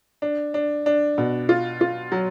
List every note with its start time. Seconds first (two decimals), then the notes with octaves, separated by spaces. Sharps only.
0.22 D4
0.54 D4
0.86 D4
1.18 B2
1.49 F4
1.81 F4
2.12 F#3